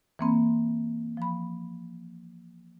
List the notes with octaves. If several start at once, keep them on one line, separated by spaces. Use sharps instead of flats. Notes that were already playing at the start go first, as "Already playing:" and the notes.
E3 A#3 C4 B5
F3 B5